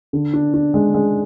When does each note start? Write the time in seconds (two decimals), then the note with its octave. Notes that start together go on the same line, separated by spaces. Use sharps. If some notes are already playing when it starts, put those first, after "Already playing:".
0.13 D3
0.33 D4
0.54 D4
0.74 G#3
0.94 G#3